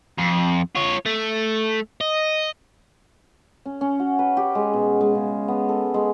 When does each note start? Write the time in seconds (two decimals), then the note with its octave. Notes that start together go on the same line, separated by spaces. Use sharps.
0.18 F2
0.75 F4 C#5
1.06 A3
2.01 D#5
3.66 C#4
3.81 C#4
4.00 F#4
4.19 B4
4.37 G4
4.55 G#3
4.74 B2
5.01 G#3
5.15 C#3
5.48 B3
5.69 A4
5.94 G#3